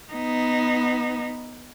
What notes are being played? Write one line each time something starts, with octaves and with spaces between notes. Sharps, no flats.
B3 D#4